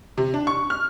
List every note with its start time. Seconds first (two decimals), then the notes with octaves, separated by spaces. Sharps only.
0.18 C3
0.34 D4
0.47 C#6
0.70 F6